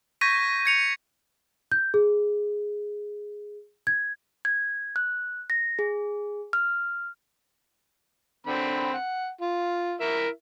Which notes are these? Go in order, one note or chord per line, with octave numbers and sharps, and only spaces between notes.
C#6 G6 G#6 A#6 B6 D#7
G#6 C#7 F7
G6
G#4
G#6
G#6
F#6
A#6
G#4
F6
D3 C4 B5
F#5
F4
E4 A#4 E5